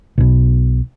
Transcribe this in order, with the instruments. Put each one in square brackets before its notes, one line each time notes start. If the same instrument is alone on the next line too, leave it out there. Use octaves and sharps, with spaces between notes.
[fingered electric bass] B1 B2